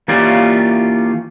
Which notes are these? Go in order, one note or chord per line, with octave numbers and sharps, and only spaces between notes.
E3 A#3 C#4 F4 G4 D5